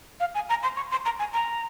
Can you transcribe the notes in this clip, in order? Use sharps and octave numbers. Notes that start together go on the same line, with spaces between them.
F5
G#5
A#5
C6
C#6
C6
A#5
G#5
A#5